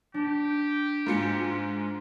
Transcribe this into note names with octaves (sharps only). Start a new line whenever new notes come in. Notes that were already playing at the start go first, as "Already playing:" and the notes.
D4 G4
G#2 F4 C#7